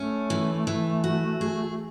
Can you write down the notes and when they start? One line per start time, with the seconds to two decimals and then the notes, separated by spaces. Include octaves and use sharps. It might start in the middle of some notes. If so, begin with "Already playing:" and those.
Already playing: A3 C#4
0.30 E3
0.67 E3
1.04 F#4
1.41 G#4